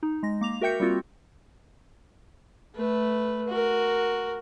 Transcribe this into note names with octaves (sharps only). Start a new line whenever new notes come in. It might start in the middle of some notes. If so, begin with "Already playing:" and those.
D#4
G#3 A#6
A#3 D6 F7
F#4 A#4 E5 G5 G6 C#7
G3 A#3 C4 F4 F#4
A3 B4
F#4 A#4